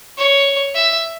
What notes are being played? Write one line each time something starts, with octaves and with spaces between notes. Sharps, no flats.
C#5
E5